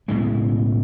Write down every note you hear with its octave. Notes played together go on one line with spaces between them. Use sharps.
B1 A2 C#3 G#3